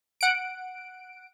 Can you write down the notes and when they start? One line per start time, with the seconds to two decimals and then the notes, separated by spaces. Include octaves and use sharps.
0.21 F#5 D7